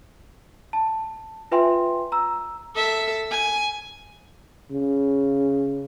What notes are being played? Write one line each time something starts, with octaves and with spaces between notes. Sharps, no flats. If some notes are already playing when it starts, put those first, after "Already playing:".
A5
F4 B4 E5 G5 G#5 C6
A#5 E6
A4 E5
G#5
C#3